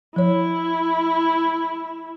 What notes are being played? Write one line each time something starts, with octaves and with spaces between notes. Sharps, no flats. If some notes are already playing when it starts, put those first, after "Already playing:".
F3 E4 C#5